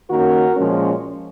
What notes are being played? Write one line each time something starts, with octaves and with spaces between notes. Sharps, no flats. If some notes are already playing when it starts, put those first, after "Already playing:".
D#3 A#3 C#4 F#4 A#4
A#2 F3 G#3 C#4